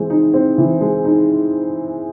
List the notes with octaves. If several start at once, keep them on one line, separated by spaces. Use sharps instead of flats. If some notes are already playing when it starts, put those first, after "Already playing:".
Already playing: E3 G#3 C4
D#4
C4
E3
G#3
D#4